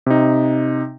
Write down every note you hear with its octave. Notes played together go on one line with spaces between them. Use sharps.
C3 D#4